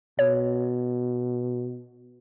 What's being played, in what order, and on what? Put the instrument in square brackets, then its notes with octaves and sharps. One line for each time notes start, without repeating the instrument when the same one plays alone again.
[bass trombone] B2 [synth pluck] C#5